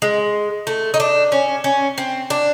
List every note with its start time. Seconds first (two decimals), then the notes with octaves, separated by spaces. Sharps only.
0.02 G#3
0.67 A3
0.94 D#4
1.00 D4
1.32 C#4
1.64 C#4
1.98 C4
2.30 D4